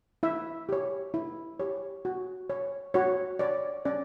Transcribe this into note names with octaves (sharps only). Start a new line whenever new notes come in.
E4 E5
G4 C#5
E4
G4 C#5
F#4
C#5
F#4 C#5
C#5 D5
C#4 D5